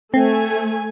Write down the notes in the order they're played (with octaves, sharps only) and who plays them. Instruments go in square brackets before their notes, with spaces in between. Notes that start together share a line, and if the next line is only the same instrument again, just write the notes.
[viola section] A3 G#5 [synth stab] C4